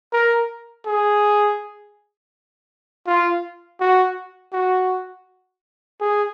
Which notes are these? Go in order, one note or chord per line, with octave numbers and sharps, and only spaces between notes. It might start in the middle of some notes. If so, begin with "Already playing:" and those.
A#4
G#4
F4
F#4
F#4
G#4